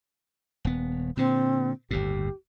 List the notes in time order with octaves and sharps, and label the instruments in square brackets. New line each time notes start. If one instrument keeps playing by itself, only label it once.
[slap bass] D#1 B3
[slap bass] A#2 D3 [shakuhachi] C4
[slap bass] G1 D#2 A2 [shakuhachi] G4